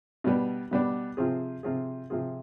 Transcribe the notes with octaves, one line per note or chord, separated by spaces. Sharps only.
B2 G3 B3 D4
B2 G3 B3 D4
C3 F3 C4 F4 G#4
C3 F3 C4 F4 G#4
C3 F3 C4 F4 G#4